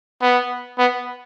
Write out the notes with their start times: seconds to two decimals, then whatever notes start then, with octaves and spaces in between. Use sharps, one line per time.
0.21 B3
0.78 B3